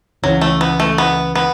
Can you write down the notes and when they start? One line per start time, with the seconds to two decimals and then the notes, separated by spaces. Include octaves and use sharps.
0.23 C#2 C#3 E3 F#3 C#4
0.41 A3
0.61 B3
0.80 A3
0.98 B3
1.35 B3